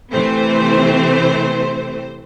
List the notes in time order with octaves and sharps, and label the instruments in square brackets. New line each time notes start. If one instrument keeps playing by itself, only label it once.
[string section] C3 E3 A3 C4 C5